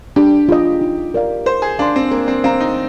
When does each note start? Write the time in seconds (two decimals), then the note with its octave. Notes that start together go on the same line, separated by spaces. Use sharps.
0.16 D4 G4
0.49 F4 G#4 D#5
0.81 D#4
1.14 A#4 D5 F5
1.46 A#4 C5
1.62 G#4
1.79 D4 F5 C6
1.96 C4
2.11 A#3 C5
2.28 C4
2.44 C4 F5 A#5
2.60 D#4